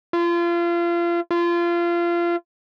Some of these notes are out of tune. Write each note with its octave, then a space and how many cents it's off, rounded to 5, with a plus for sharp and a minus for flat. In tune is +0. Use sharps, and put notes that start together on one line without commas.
F4 -30
F4 -25